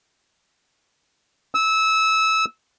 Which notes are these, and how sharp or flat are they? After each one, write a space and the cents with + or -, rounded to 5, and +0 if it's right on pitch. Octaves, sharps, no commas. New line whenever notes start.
E6 -20